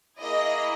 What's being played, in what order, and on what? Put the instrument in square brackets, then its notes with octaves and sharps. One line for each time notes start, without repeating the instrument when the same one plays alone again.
[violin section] A#3 E4 G#4 D#5